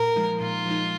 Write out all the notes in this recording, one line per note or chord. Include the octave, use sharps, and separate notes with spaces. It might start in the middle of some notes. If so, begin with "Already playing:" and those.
Already playing: A#2 A#4
F3 G#3 D#4
A#2 F4
F3 G#3 D#4